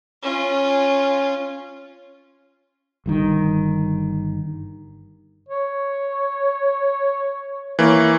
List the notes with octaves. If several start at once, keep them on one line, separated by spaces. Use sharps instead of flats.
C#4 F4
G1 G2 D#3
C#5
E3 A#3 C#5